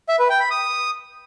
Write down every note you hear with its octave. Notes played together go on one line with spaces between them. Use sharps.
E5
B4
G5
B5
D#6